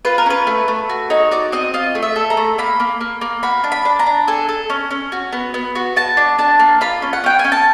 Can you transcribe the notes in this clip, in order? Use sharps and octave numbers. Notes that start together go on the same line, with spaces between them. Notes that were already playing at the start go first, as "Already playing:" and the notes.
F4 B4
A#4
C#4 B4
A3
A3
F#4
D#4 C#5
F#4 D5
C4 D#5
F4 D#5
A3
E5
A4
A#5
A3
A#3 B5
A#3
A#3
A#3
F#4 B5
D4
B5
D4
A#5
D4
A4 G#5
A4
C#4
C#4
F#4
B3
B3
F#4
F#4 A5
D4
D4 A5
A#3
F4 B5
C#4
F#5
C#4 G5
G#5
C#4
A5